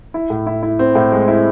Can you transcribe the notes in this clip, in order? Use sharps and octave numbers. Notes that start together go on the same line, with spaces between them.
E4
A2
E4
E4
C4
A2
G#3
E4